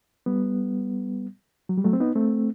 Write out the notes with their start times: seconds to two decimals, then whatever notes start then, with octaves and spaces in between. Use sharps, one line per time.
0.26 G3 B3
1.69 F#3
1.78 G3
1.84 F#3 A3
1.93 C4
2.00 B3 D#4
2.15 A3 C4